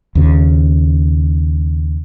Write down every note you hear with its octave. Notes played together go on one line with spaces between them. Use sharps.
D#2 C#3